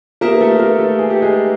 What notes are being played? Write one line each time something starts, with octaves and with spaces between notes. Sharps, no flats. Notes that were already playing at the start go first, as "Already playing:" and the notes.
A#3 D#4 G4 A#4 B4 E5
A3 A4
A#3 A#4
A3 A4
G#4
G4
G#3 G#4